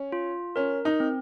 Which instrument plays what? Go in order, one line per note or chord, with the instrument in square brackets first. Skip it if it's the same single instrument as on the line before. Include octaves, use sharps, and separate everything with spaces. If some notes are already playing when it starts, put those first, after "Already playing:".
Already playing: [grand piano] C#4
[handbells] F4
[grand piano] C#4 [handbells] A#4
[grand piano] D#4
[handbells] C4